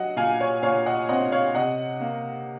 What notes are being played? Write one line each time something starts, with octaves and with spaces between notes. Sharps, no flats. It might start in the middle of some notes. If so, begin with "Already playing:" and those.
Already playing: F#3 D#5 F#5
A#2 F5 G#5
C#5
A#2 C#5 F5
D#5 F#5
C4 D#5 F#5
C#5 F5
C3 D#5 F#5
A#3